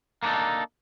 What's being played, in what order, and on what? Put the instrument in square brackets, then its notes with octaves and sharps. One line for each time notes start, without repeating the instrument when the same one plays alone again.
[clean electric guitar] A#3 B3 D4 D#4 A4